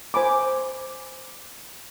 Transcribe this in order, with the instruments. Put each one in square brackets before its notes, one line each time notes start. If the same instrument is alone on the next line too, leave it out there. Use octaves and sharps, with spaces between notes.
[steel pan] C5 G#5 B5 D6